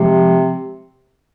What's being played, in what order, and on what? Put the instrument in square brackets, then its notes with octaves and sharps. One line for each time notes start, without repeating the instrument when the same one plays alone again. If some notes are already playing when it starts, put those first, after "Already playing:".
Already playing: [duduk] C3 [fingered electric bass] F3 G#3